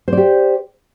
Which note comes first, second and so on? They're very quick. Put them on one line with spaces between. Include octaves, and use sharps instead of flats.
C5 D5 G4